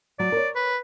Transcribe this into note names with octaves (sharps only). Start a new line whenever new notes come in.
F#3 D5
A#4 C#5
B4